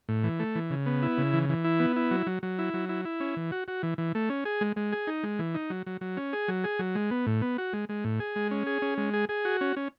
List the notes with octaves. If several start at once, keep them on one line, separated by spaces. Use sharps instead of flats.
A2
E3
A3
E3
C#3
B3
E4
C#3
E3
E3
E4
B3
E4
F#3
F#3
F#3
E4
F#3
E4
E4
C#4
E3
F#4
F#4
E3
E3
A3
C#4
G#4
G#3
G#3
G#4
D#4
G#3
E3
D#4
F#3
F#3
F#3
C#4
G#4
F#3
G#4
F#3
G#3
B3
A2
B3
F#4
G#3
G#3
A2
G#4
G#3
C#4
G#4
C#4
G#3
G#4
G#4
F#4
C#4
C#4